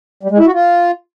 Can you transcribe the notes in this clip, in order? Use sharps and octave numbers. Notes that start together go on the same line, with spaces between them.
G3
G#3
E4
F#4
F4